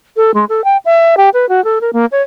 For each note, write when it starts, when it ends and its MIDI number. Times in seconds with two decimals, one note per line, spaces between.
0.16 0.31 69
0.34 0.45 56
0.49 0.64 69
0.64 0.77 79
0.85 1.15 76
1.17 1.29 67
1.34 1.48 71
1.49 1.63 66
1.64 1.79 69
1.81 1.91 70
1.93 2.06 58
2.12 2.22 73